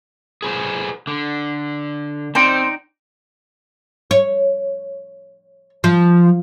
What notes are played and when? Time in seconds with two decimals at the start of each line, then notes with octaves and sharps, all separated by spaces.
0.43 G#4 B4 C5
1.07 D3
2.35 C4 D#4 C5 D5 G5
4.11 C#5
5.84 F3